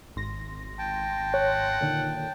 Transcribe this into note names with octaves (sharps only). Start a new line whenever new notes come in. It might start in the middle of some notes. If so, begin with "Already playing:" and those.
G#1 C6 A#6
G5 A5
C#5 F#5
A#2 D3 D#3